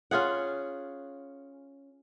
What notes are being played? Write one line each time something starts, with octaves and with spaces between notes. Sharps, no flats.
C#4 F4 G#4 F#5